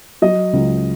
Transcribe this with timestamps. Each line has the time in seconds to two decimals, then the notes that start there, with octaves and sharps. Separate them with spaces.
0.22 F#3 D#5
0.53 C#2